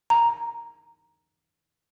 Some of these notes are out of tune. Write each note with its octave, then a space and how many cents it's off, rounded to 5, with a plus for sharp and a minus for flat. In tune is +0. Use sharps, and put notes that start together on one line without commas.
A#5 +5